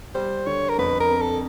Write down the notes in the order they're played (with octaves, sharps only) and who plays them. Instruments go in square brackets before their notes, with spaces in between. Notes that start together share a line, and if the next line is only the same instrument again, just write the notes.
[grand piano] G3 [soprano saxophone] C5
[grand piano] D3 [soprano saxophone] C#5
[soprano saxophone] A#4
[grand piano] F2 [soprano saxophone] B4
[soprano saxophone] A#4
[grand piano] C4
[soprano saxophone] A4